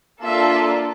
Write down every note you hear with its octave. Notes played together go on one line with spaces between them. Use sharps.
A#3 D4 F4 A4 E5